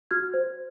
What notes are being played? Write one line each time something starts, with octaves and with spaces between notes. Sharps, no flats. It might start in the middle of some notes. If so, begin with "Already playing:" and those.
F#4 F6 G#6
C5